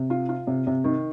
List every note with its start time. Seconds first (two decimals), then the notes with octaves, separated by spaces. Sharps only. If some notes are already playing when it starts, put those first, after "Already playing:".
Already playing: C3
0.10 F4
0.29 F4
0.47 C3
0.67 C3
0.84 D#3